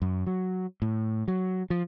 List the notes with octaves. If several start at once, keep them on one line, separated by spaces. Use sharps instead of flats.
F#2
F#3
A2
F#3
F3